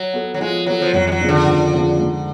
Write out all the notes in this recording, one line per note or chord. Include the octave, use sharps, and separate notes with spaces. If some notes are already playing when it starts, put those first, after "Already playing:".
Already playing: F#3
B3 F#4 A4
F#3
F3 G#3
F#3 B3 F#4 A4
F3
F2 F#3
G#3
F#3
C#3 F3 B3 D4
D3
F2
C#3 F3 B3 D4
G#2